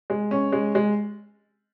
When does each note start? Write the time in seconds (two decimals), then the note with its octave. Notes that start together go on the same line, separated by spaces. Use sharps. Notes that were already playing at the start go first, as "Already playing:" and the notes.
0.10 G#3
0.31 C#4
0.52 G#3
0.75 G#3